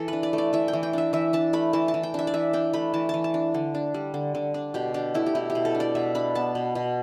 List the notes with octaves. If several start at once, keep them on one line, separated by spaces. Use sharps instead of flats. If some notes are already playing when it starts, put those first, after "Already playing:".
Already playing: E3 A4
D4 B4
D5
A3
D5
E3 E5
G5
E3
G5
D4 E5
E3 E5
D4 A5
A3 B5
E3 A5
A5
E3
G5
D4 E5
D5
E3 E5
D4 G5
A3 B5
E3 A5
E3 A5
A5
D4
D3
D4
G3
D3
D3
D4
B2 G4
D4 G4
A3 E4
G4
B2 E4
G4
B2
A4
D4
D5
B2 E5
D4 B5
B3 A5
B2
B2